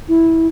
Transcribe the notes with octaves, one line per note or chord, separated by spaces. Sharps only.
E4